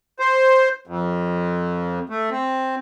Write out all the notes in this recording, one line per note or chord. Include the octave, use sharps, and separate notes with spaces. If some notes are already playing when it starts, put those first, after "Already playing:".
C5
F2
A3
C4